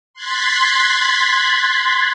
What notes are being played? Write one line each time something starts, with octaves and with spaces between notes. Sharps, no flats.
C6 F#6 G#6 A6 B6